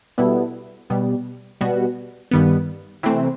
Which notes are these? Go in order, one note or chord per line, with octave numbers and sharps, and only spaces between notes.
B2 G3 B3 E4 A4
B2 G3 B3
B2 G3 B3 F#4
G2 D#3 G3 B3
C3 E3 A3 C4